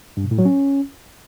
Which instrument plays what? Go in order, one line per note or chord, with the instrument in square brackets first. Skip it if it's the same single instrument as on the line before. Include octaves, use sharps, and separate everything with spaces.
[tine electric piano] G2
B2
A2
F#3
C#4